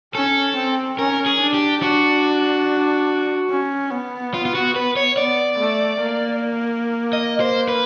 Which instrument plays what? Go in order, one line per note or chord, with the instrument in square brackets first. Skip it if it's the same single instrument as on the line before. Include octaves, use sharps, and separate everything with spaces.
[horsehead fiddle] C#4 [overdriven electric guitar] A4
[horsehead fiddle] C4
[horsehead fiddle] C#4 [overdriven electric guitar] A#4
[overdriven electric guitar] G#4
[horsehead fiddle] D4
[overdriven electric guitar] G4
[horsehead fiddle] D4 [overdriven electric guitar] F#4
[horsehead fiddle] C#4
B3
[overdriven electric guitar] F4
F4
F#4
B4
C#5
[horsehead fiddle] B3 [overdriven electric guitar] D5
[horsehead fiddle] A3
A#3
[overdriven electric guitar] D#5
C5
B4